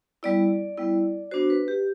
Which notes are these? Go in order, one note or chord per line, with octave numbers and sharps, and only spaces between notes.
G3 B3 E4 D5
G3 B3 E4
B3 D4 F#4 C5
B4
G4